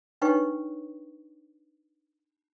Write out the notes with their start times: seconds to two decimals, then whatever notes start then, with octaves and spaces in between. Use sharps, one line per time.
0.22 D4 D#4 B4 C#5 G5 C#6